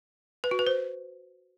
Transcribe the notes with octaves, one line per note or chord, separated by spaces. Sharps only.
B4
F#4
B4
C5